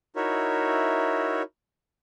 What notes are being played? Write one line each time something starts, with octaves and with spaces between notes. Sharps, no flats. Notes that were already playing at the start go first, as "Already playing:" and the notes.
D#4 E4 F#4 A#4 C#5 E5